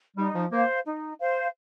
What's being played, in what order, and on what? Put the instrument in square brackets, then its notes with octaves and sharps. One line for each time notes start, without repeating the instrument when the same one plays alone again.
[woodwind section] G3 [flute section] D#4
[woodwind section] F3
[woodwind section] A#3 [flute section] C5 F5
[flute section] D#4
C5 F5